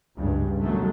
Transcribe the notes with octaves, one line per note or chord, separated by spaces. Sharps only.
G#1 C#2 G2
B2 D#3 F#3 G#3 A3